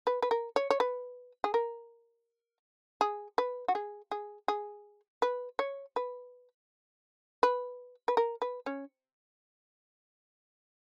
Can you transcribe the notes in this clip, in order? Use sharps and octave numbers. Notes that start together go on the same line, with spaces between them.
B4
B4
A#4
C#5
C#5
B4
G#4
A#4
G#4
B4
F#4
G#4
G#4
G#4
B4
C#5
B4
B4
B4
A#4
B4
C#4